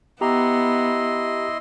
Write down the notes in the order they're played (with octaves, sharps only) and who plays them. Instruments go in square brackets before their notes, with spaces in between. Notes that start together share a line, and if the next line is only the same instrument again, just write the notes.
[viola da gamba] B3 [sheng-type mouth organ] E4 D#5 C6 [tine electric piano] G4 A#5